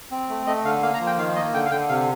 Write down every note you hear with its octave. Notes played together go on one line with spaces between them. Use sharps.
C4
A3
A3 D#5
D3 F5
A#3 F5
A#5
F3
G5
D#3 F5
A#3 D#5
D3 G5
F5
D3 G5
C3 F5